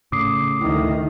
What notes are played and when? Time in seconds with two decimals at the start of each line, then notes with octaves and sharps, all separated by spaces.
0.12 A2 C#3 D6 D#6 C7
0.61 D2 D#3 E4